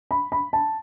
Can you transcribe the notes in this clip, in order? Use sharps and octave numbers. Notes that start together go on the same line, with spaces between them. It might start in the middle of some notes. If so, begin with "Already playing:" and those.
B5
B5
A5